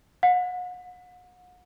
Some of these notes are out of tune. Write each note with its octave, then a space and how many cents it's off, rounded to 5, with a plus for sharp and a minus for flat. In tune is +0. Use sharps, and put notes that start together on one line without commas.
F#5 -40